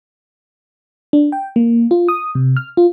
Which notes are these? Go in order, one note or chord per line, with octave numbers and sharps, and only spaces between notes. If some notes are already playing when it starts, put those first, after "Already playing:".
D4
G5
A#3
F4
D#6
C3
F6
F4